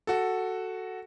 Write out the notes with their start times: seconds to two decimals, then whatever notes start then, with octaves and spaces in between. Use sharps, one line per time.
0.07 F#4 A4